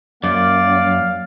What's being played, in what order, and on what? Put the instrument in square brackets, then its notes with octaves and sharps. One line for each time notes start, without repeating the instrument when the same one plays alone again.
[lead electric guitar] F#2 [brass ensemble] A#3 F5 [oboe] D5